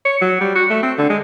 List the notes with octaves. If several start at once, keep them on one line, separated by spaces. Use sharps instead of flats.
C#5
F#3
G3
F#4
A3
C4
D3
G#3